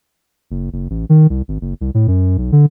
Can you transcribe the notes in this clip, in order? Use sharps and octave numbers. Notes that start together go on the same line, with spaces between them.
F#1
F#1
A1
D#3
C2
G#1
F#1
C2
A2
F#2
B1
D3